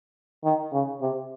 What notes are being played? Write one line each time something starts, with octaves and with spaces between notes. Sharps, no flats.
D#3
C#3
C3